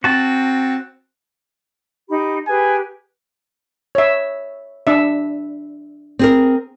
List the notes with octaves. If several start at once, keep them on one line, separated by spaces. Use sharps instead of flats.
C4 F#4 A5
D#4 G4 B5
G4 G#4 B4 G#5
C#5 E5
D4 E5
C4 G#4 A#4